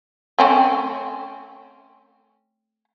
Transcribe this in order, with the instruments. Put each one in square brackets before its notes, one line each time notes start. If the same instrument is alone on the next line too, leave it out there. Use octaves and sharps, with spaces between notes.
[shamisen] A3 C4 C#4